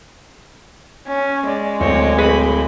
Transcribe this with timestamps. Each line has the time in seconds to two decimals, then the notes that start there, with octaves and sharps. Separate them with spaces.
1.08 C#4
1.47 G#3 D5
1.80 D1 C4 C#5
2.19 C4 G#4 B4 B5